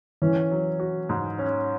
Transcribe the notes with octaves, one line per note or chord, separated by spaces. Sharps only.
E3 C#4
F#3
F#4
G#2
C#4